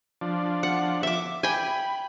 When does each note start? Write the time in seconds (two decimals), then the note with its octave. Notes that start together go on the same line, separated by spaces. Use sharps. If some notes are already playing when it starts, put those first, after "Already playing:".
0.21 F3 D4
0.63 F#5
1.03 E5 D6
1.43 G5 G#5 B5